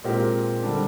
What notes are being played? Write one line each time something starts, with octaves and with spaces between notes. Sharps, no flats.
A#2 G#3 C4 G4 A#4
D3 G3 D4